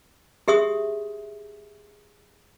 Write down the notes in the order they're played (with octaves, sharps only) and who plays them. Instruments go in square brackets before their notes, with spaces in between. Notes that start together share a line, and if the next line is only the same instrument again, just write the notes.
[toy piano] G4 G#4 E5 C6 D#6